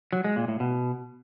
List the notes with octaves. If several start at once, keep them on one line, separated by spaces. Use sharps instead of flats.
F#3
G#3
A#2
A2
B2